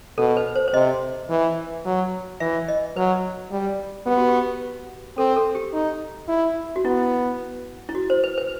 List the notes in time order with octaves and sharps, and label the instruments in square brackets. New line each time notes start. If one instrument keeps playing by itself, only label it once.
[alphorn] B2 [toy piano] A4
[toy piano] B4
C5
C5
[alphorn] C3 [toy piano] D#5
[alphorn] E3
F#3
[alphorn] E3 [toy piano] E5
[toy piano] D#5
[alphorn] F#3 [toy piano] B4
[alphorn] G3
[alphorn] B3 [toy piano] G4
[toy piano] F#4
G4
[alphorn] C4 [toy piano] A4
[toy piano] A4
G4
[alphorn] D#4
E4
[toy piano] F#4
[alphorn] B3 [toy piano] E4
[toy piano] E4
F#4
C5
B4
B4